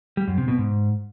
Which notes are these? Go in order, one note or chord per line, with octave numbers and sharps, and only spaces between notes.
G3
F#2
C3
B2
G#2